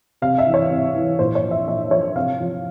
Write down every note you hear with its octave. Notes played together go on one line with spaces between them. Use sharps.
C3 F5
E5
E3
C#5
C3
E3
A#2 C5
C#5
F3
E5
A#2 E5
F3 C#5
C3 F5
F3